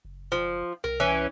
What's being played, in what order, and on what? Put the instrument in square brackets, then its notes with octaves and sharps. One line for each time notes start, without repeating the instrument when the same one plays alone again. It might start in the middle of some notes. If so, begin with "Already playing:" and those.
[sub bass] F#1
[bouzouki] F3
[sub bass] C2 [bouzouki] A#4
[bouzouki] E3 C#4